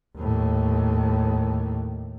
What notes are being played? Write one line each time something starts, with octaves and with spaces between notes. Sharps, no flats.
D#2 A2